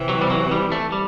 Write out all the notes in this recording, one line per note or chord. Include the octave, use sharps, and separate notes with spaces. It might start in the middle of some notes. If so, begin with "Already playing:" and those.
Already playing: C3 E3
F#3
G3
F#3
G3
A3
G3